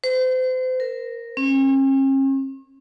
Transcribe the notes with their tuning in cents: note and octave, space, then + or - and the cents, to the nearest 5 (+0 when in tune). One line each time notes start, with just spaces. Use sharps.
C5 -35
A#4 -5
C#4 -45